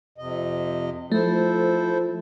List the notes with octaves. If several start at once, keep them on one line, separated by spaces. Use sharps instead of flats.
F2 C3 D#5
F3 A3 E4 A4 C5